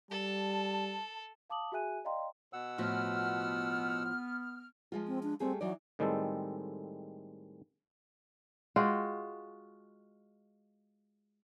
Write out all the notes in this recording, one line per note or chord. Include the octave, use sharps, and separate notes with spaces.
G3 A4 A5
F5 A5 D6 D#6 F#7
F#4 G#4 E5 G#5 F#6 D#7
D5 D#5 F5 G5 A#5 C6
B2 F#5 E6
A2 F3 B3 F#4 F6
F3 G#3 F4
C4
D4
G3 A3 C4 G#4
E3 F#3 D#4 D5
A2 D#3 G3 G#3 C4 A4
G#3 F4 F#4 G5